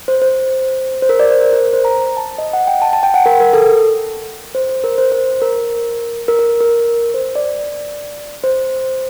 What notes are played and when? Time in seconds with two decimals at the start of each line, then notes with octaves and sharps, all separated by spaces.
0.08 C5
0.22 C5
1.02 C5
1.09 A#4
1.19 D5
1.31 C5
1.41 A#4
1.53 A#4
1.73 C5
1.85 A#5
2.17 A5
2.38 D#5
2.53 F#5
2.67 G5
2.82 A5
2.93 A5
3.03 G5
3.14 F#5
3.26 A#4
3.40 A#4
3.53 A4
4.55 C5
4.69 C5
4.84 A#4
4.98 C5
5.12 C5
5.42 A#4
6.28 A#4
6.39 A#4
6.61 A#4
7.14 C5
7.35 D5
8.44 C5